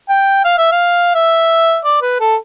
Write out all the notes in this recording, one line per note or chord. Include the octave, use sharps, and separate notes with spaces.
G5
F5
E5
F5
E5
D5
B4
A4